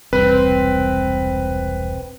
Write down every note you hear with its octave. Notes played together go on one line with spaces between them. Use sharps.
E1 C2 C4 B4